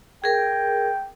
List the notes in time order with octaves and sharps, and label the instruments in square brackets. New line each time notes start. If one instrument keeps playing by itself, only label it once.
[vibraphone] G#4 A#4 [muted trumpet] G5